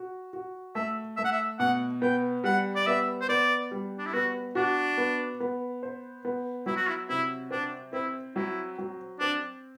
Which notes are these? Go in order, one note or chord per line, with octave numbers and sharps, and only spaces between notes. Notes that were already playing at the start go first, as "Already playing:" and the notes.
Already playing: F#4
F#4
A3 E5
A3 E5
F#5
E5
B2 F#5
B3 G5
G3 F#5
D5
B3 E5
C5
B3 D5
G3
D4
E4
B3 F#4
D4 F#4
B3
B3
C5
B3
F#3 E4
F#4
E4
C3 E4
C4 D4
C4 E4
F#3 E4
F#3
C4 D4